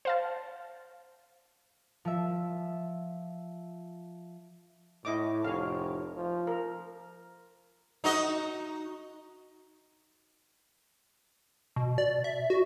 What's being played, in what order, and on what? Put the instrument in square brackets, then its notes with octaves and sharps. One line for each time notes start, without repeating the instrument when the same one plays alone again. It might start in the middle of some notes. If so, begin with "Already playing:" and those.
[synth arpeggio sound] C5 F5 A5
[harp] F3 E5
[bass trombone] A2 [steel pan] E4 D#5 D6
[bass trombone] F1 [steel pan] C#5 F5
[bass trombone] F3
[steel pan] A#4
[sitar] D#4 F#4 D#5
[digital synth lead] B2
D5
E5
F#4